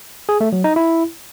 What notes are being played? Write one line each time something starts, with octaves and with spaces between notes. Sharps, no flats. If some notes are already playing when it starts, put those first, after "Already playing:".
G#4
A3
F#3
D#4
E4